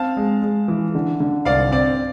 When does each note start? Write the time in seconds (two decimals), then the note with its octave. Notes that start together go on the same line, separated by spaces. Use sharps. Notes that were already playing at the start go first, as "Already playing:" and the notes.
Already playing: C4 F5 A5
0.17 G#3
0.42 G#3
0.68 E3
0.95 D3
1.20 D3
1.45 C2 D5 F5
1.71 C4 D5